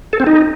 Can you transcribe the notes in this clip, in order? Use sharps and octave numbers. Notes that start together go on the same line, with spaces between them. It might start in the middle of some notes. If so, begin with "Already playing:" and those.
A4
C4
D#4